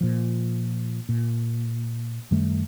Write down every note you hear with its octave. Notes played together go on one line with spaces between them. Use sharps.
A#2 F3
A#2
F#2 D#3 G3 A3